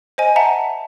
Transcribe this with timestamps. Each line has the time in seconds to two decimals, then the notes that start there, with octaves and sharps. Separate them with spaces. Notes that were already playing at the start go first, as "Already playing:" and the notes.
0.18 C5 D#5 G#5
0.36 E5 F#5 A5 A#5